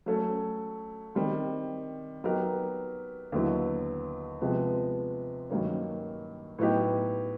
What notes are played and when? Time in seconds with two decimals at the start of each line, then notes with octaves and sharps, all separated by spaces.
0.06 F#3 A3 C#4
1.15 D#3 G3 C4
2.24 F#3 B3 D#4 G4 A#4
3.32 D#2 D3 F#3 B3 E4
4.41 C3 F3 G#3 B3
5.50 G2 D#3 F#3 A#3 C#4
6.58 A2 F#3 B3 D#4 G4